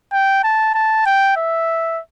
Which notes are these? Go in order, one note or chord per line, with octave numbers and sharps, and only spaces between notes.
G5
A5
A5
G5
E5